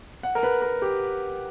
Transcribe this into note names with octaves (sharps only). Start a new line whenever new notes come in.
F#5
A#4
B4
A#4
G4